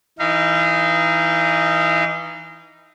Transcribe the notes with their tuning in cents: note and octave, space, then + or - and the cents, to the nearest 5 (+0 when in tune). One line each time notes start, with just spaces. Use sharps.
E3 +0 D#4 +0 F5 -40